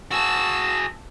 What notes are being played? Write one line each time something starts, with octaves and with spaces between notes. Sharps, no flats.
F#4 G#4 A5 E6